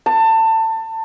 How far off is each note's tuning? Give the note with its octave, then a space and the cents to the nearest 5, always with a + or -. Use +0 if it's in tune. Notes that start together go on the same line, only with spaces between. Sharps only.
A5 +25